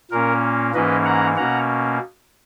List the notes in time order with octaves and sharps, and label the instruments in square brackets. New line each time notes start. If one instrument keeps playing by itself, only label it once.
[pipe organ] A#2 A#3 C#4 A#4
G#2 E3 A#3 C#4 B4 D#5
F#5 A#5
B2 A#3 C#4 F#5 A#5